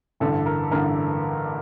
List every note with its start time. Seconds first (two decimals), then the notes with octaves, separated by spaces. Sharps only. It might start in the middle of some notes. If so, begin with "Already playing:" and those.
0.20 A1 G2 D3 A4
0.46 A#4
0.71 A1 G2 D3 A#4